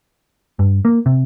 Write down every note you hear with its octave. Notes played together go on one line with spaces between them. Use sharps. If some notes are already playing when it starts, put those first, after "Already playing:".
G2
A#3
C3